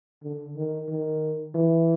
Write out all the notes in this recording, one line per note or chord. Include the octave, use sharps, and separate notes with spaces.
D3
D#3
D#3
E3